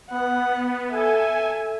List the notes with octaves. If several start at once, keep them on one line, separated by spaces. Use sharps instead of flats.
B3 F#5
A4 E5 G#5